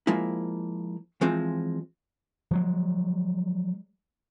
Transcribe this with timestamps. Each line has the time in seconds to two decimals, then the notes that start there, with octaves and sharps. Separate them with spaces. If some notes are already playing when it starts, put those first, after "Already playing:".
0.07 F3 G#3 A#3 E4
1.21 E3 F3 G#3 C4
2.51 F3 F#3 G#3